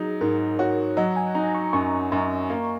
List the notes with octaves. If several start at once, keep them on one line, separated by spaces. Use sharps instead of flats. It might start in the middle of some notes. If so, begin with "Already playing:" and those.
Already playing: F#3 D#4 G#4
G#2 A#4
F#4 C#5
F#3 D#5
G#5
D#4 A#5
C#6
F#2 C#6
F#2
A#3